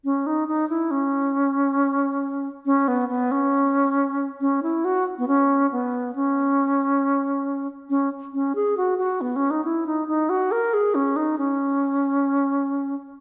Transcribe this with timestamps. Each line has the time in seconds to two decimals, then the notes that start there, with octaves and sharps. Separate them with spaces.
0.04 C#4
0.26 D#4
0.48 D#4
0.69 E4
0.91 C#4
2.65 C#4
2.88 B3
3.09 B3
3.31 C#4
4.41 C#4
4.63 E4
4.85 F#4
5.18 B3
5.28 C#4
5.72 B3
6.15 C#4
7.89 C#4
8.33 C#4
8.55 G#4
8.77 F#4
8.98 F#4
9.21 B3
9.36 C#4
9.50 D#4
9.64 E4
9.86 D#4
10.08 D#4
10.29 F#4
10.51 A#4
10.74 G#4
10.95 C#4
11.16 D#4
11.38 C#4